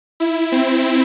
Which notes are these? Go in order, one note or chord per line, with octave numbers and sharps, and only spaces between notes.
E4
C4